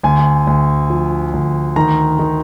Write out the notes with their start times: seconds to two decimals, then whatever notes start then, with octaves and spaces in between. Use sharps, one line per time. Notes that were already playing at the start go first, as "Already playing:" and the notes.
0.03 D2 G#5
0.47 D2
0.90 F3
1.33 D2
1.76 D#3 A#5
2.19 D#3